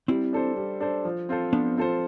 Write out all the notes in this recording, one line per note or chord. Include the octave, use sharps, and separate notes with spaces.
G3 C4 E4
D4 A4 C5
G3
D4 A4 C5
F3
C4 F4 A4 C5
F3 B3 D4
C4 F4 A4 C5